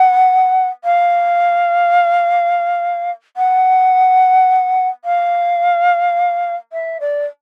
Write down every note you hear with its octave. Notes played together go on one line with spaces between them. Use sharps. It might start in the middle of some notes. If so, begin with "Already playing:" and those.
Already playing: F#5
F5
F#5
F5
E5
D5